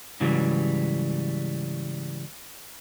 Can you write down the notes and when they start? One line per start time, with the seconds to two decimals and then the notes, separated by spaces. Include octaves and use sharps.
0.20 G#2 C#3 E3 F#3 G3